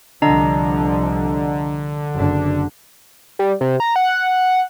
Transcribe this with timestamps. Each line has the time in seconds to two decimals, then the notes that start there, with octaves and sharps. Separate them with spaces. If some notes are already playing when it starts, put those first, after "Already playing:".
0.22 C2 D3 F3 D4 D#5 A#5
2.14 F#1 D4
3.39 G3
3.61 C3
3.80 A#5
3.96 F#5